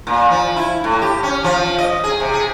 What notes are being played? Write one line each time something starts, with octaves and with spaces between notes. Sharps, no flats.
A#2
F3
E4
A2
G4
C#4
F3
D#5
G#4
C3
G#4